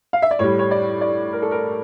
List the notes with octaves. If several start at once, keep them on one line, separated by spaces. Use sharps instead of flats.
F5
E5
D5
A2 G3 C#5
C#5
D5
D5
A#4
A4
A#4